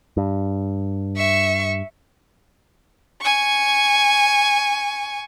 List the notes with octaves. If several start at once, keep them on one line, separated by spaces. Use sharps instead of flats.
G2
E5 C#6
G#5 C#6